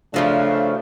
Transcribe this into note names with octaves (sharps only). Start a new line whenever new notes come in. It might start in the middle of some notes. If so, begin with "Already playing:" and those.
C#3 F3 F#3 A3 D4